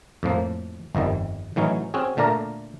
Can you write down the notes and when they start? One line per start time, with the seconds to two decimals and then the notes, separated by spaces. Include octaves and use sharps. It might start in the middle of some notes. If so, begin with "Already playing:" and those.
0.23 F2 A2 F3 A#3
0.95 G1 F2 D#3 G3
1.56 A2 E3 F#3 C#4 D#4
1.94 C4 C#4 F#4 G#4
2.17 A#2 D3 A3 A#4 D5 A#5